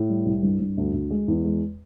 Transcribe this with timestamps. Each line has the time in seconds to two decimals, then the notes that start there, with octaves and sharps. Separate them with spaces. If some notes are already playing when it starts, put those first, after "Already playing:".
Already playing: A2
0.10 G3
0.26 C2
0.43 G2
0.60 G2
0.77 D2
0.94 D2
1.11 G#3
1.28 E2
1.44 G#3